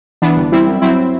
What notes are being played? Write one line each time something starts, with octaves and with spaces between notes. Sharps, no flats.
E3 B3 D4
G1
G3 C4 E4
F#2
F#3 C4 E4